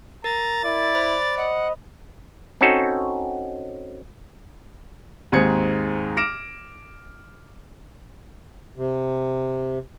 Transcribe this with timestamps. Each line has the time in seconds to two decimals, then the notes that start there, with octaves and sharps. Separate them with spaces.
0.24 A#4 A#5 A6
0.64 E4 D5
0.95 C5 B5
1.38 D#5 F#5
2.61 C4 C#4 D#4 F#4 A4
5.32 D#2 G#2 C4 G#4 G#6 C#7
6.16 D6 F6 A#6 D7 E7
8.77 C3